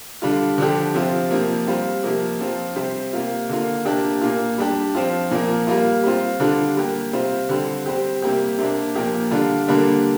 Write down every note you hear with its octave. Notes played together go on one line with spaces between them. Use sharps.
D3 G3 D4 F4
D3 F3 D4 G4
C3 F3 C4 F4
C3 F3 A#3
G3 C4 F4
C3 F3 A#3
F3 C4 F4
C3 G3 C4 G4
C3 A#3 F4
D3 A#3 F4
C3 A#3 D4 G4
A#2 A#3 F4
G3 D4 G4
F3 C4 F4
A#2 F3 A#3
G3 A#3 F4
G3 C4 F4
D3 G3 D4 F4
G3 A#3 G4
C3 G3 C4 F4
D3 G3 C4
G3 C4 G4
C3 G3 A#3 G4
C3 A#3 D4
A#2 F3 A#3 G4
D3 G3 D4 F4
D3 G3 A#3 D4